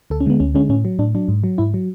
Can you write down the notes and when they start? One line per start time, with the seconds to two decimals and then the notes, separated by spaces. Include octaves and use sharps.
0.10 D2 A4
0.20 C#4
0.26 D3 G#3 B3
0.40 D2 C#4
0.54 D3 G#3 C#4
0.69 A2 C#4
0.85 F#3
0.99 A2 D4
1.15 F#3 D4
1.28 G#2
1.44 F#3
1.58 G#2 E4
1.74 F#3